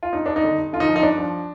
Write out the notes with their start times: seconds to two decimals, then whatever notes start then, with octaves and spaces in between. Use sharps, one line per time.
0.03 F4
0.13 G2 D#4
0.26 G2 D4
0.36 D#4
0.43 D3
0.58 G2
0.73 D3 F4
0.80 D#4
0.88 F3
0.96 D#4
1.02 G2 D4
1.18 F3